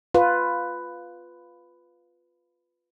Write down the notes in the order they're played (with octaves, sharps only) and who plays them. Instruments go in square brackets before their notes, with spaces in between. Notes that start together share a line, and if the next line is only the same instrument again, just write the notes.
[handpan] F4 B4